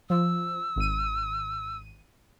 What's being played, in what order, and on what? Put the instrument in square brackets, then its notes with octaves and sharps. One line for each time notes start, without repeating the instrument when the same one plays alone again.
[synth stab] F3 [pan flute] E6
[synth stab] G#1 D#7